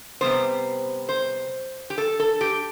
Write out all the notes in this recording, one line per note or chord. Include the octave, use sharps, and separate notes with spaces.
C3 G3 B3 C5
C5
G4
A4
A4
G4